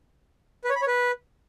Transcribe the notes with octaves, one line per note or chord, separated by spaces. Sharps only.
B4
C#5
B5
C#5
B4